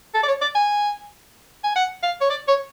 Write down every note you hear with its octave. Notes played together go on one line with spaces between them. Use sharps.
A4
D5
C#5
D5
G#5
G#5
F#5
F5
C#5
D5
C#5